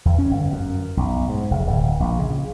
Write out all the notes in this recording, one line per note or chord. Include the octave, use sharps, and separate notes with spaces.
E2
C#4
G1
F#2
B1
G#2
F1
D1
A#1
C#3